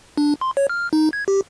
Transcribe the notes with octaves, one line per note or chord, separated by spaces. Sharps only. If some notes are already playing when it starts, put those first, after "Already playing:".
D4
C6
C#5
F6
D#4
G#6
G4